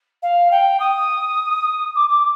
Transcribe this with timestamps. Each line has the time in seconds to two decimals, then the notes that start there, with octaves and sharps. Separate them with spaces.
0.22 F5
0.51 G5
0.79 D#6
1.95 D6
2.09 D6